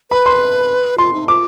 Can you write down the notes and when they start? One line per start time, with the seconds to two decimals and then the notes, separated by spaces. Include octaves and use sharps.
0.10 B4 B5
0.26 C6
0.98 F4 C6
1.13 D#4
1.28 F4 D6